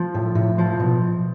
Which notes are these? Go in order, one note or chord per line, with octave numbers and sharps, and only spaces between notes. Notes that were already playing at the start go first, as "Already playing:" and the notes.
Already playing: F3
A2
A2
F3
B2